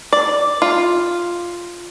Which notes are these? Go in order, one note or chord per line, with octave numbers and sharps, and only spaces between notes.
D5
F4